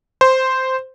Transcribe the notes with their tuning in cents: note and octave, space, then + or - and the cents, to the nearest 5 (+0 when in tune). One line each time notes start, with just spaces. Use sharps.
C5 -5